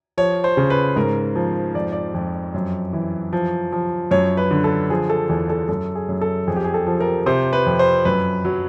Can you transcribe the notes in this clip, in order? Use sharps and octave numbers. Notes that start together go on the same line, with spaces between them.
F3 C#5
C5
C#3
B4
G#2 A#4
F3
F2 D5
D5
F2
F#2
E3
F3
F3
F#2 C#5
B4
D3
A4
F3 G#4
A4
E2 G#4
A4
F#2 A4
G#4
F#2
A4
F2 G#4
G4
G#4
A4
F3
A#4
C3 C5
B4
F2
C5
F#2 B4
F#3